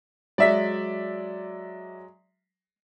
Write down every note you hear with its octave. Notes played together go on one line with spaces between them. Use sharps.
F#3 G#3 D5 E5 B6